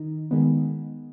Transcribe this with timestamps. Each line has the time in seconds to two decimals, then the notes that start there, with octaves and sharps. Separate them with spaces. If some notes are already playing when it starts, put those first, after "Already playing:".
Already playing: D#3 D#4
0.31 D#3 G#3 B3